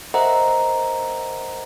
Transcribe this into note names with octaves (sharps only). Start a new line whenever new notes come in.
A#4 C5 D#5 E5 F#5 A#5